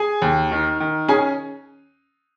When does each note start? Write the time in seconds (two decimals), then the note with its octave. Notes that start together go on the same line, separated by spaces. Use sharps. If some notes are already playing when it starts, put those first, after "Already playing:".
Already playing: G#4 G#5
0.22 D#2
0.51 D#3
0.80 D#3
1.08 C#4 G#4 G#5